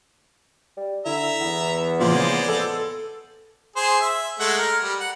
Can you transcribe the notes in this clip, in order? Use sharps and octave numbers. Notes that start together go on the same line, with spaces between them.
G3
D3 E4 E5 A#5
E2 B3
A#2 C#3 F3 G#3 C5 D5
A4
G#4 C5
E5
G#3 A3 F#5
A#4
G3
F#5